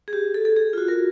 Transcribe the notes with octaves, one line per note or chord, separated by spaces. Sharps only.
G#4
G4
A4
A4
G#4
F4
F#4
A#4